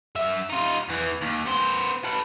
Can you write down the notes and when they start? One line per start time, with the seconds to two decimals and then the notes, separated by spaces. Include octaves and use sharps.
0.16 F#2 E5
0.49 D#4 F4
0.88 E2 E3
1.21 D#2
1.45 B3 C5
2.04 A4 B4